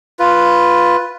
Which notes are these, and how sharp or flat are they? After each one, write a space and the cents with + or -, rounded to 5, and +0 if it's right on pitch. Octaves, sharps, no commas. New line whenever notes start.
F4 +0 B4 +0